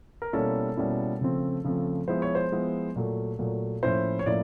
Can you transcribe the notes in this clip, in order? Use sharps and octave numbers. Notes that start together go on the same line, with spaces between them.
A#4
B2 G3 A#3 C#4 E4 A4
B2 G3 A#3 C#4 E4
C#3 F3 A3 C4
C#3 F3 A3 C4
F3 G#3 B3 E4 C5
C#5
C5
F3 G#3 B3 E4
A#2 F#3 A3
A#2 F#3 A3
A2 F3 A#3 C#4 E4 C5
C#5
A2 F3 A#3 C#4 E4 D5